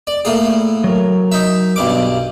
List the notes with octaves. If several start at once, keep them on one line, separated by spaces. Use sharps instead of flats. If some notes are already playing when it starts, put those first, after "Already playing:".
D5
A2 A#3 G#4
F#3 A#4
D#4 E5
B1 G2 D6